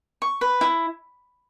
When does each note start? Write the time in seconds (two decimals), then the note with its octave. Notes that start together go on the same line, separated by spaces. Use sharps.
0.22 C#6
0.41 B4
0.61 E4